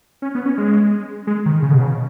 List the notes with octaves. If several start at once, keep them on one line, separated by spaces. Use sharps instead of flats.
C#4
B3
C#4
G#3
G#3
D#3
C#3
B2
C#3